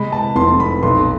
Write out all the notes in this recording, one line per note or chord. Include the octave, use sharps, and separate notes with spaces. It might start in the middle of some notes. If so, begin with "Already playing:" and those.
Already playing: C3 G#3 B5
A5
F1 C6
B5
B1 C6